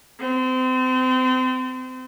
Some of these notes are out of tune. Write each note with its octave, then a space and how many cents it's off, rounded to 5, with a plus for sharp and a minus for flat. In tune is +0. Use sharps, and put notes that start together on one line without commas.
C4 -30